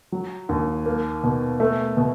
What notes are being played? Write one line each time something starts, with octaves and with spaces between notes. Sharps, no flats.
F#3
D#2
A#3
B2
A3
B2